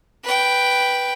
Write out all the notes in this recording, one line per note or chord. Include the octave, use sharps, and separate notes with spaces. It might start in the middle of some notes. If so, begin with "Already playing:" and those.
B4 G5